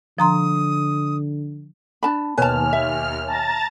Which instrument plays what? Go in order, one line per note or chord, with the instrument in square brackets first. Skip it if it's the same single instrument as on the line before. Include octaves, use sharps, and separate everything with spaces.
[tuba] D3 [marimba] F3 A#5 C6 [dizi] D#6
[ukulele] D4 A5 B5
[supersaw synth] D#2 F6 [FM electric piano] B2 C#5 G#5 [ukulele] B4 A5
[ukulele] E5
[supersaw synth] A5 A#5 A6